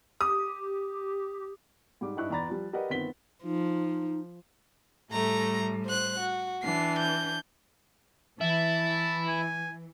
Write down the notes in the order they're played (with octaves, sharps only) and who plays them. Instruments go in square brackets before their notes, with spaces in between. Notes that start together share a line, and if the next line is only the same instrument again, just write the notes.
[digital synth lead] G4 [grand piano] D#6
[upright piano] G#2 G3 D6
G2 D#4 E4 C#6 F#6
E2 D5 A#5 B5 A6
F3 G3
G4 A#4 B4 D5 D#5 F#5
G1 D#3 B3 C4 B6 G7
[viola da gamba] F3 [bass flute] D#4
[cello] A2 G3 [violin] A3 A#5
[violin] C5 F#6
F#4
[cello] E3 D4 [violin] C7
[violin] G6
[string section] E3 [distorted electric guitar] E4 E5 [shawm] A5
[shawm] G#5